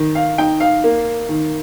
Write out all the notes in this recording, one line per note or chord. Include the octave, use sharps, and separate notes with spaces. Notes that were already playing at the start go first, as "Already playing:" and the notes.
Already playing: D#3
F5
D#4 G5
F5
A#3
D#3